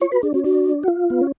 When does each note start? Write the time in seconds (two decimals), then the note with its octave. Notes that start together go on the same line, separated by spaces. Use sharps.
0.01 F4 C#5
0.12 F#4 B4
0.22 D4 G#4
0.34 C#4 F#4
0.44 D4 F#4
0.83 F#4
0.88 F4
1.10 B3
1.21 C#4